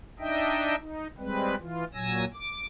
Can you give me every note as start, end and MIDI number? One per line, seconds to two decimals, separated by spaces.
0.20 0.76 62
0.20 0.76 63
0.20 0.76 75
0.20 0.76 76
0.20 0.76 79
0.79 1.07 63
1.18 1.55 55
1.18 1.55 56
1.18 1.55 60
1.18 1.55 71
1.60 1.84 52
1.60 1.84 65
1.94 2.25 46
1.94 2.25 54
1.94 2.25 80
1.94 2.25 88
1.94 2.25 94
2.34 2.66 86